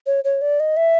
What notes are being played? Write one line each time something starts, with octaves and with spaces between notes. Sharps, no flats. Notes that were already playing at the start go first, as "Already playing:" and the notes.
C#5
C#5
D5
D#5
E5